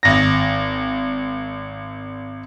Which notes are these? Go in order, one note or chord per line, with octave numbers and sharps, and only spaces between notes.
G#1 A#6